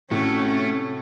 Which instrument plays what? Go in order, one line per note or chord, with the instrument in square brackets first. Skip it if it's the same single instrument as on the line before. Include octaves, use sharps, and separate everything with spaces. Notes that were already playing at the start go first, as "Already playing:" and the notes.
[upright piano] A2 [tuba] C3 [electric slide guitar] A3 [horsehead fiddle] C#4 F#4